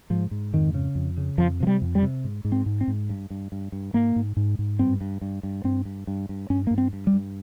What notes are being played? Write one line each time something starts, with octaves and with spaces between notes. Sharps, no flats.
G#2 F3
G#2
F2 D#3
C#3
F2
C#3
F2 F3
C3 F3
G3
F2
G3
C3
G#2
G#2
C4
G#2
C4
G#2
G2
G2
G2
G2
G#2 A#3
G#2
G#2
G#2
G2 C4
G2
G2
G2
G2 C4
G2
G2
G2
G2 C#4
G2 A#3
C4
G2
G3
G2